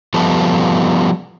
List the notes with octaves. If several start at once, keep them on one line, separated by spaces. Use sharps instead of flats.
F3 G3 B3 A4